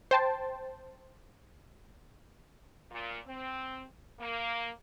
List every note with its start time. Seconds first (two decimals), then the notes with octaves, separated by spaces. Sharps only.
0.11 C5 G5 A5
2.91 A#2
3.26 C4
4.20 A#3